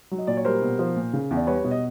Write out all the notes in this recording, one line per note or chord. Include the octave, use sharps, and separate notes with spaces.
F#3
D#5
A#2 D5
C#5
G3 A#4 C5
B2
F3
A#2
C#3
E2
D5
G3 B4 C#5
B2
D#5